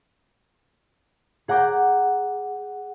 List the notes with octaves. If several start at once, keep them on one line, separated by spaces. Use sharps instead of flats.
G#4 F#5 A#5 D6 G6